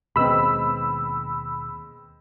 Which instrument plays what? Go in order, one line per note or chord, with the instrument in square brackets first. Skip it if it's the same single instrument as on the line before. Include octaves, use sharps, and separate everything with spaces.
[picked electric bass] D#2 B2 D#3 [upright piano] G#3 B3 C4 [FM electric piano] B5 E6